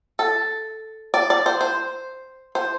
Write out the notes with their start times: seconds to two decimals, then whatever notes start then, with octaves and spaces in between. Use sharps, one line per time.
0.19 A4
1.14 D5
1.30 D5
1.46 C5
1.61 C5
2.55 C5